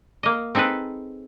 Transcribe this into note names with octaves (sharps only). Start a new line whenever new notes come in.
A#3 D#5
C4 D#4 G#4 A4 B4